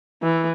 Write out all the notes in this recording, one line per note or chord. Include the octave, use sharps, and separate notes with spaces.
E3